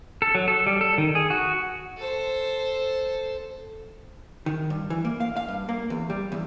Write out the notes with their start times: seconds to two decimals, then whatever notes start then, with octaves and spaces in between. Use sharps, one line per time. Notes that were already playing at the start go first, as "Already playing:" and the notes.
0.22 A4
0.35 F#3
0.48 A4
0.67 G3
0.81 A4
0.98 D#3
1.15 G#4
1.30 F#4
1.97 A4 C5
4.46 D#3
4.70 G2
4.90 E3
5.05 A#3
5.20 F5
5.37 F5
5.48 G2
5.69 A#3
5.90 E2
6.10 G3
6.32 E2